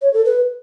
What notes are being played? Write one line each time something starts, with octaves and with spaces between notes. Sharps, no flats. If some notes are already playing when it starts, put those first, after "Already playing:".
C#5
A4
B4